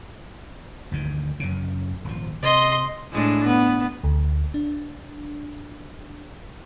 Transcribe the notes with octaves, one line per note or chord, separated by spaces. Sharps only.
D2 G2 D#3
F#2 C#3
D#1 G#1 F3
C3 D#5 C6
A2 G#3 D4
B3
D2
D4